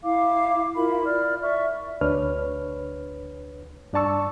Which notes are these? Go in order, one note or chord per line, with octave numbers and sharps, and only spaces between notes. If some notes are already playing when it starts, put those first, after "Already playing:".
E4 F5 D6
E4 F4 A#4 B5
D5 F6
D5 E5 C#6
D2 D4 B4 C#5 F6
G2 D4 D5 A5 C#6 E6